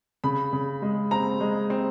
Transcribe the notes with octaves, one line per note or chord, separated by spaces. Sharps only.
C#3 B5
C#3
G#3
C4 A#5
G#3
C4